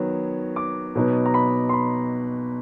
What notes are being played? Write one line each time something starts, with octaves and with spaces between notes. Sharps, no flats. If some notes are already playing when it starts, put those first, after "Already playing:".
Already playing: D#3 F#3 B3
D6
B2 F#3 B3 D#4
A#5
B5
C6
B5